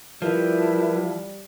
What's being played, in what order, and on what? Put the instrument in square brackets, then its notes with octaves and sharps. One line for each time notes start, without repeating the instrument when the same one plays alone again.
[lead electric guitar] F3 [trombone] G3 [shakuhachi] E4 [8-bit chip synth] A#4 B4